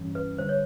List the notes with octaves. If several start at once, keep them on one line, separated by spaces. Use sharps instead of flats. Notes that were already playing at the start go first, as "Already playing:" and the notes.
Already playing: G2 E3 G3 C#4
B4
D3 G3 C5
C#5